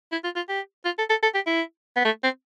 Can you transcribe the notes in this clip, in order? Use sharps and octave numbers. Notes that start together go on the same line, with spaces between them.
E4
F4
F4
G4
F4
A4
A4
A4
G4
E4
B3
A3
C4